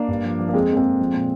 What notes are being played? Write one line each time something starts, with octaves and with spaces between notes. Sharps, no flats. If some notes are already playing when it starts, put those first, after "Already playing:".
Already playing: A#3 D4
G2
F3
F3
A#3
F2 G#3 C4
F2 A#3
G#3 C4
F2
F3
A#2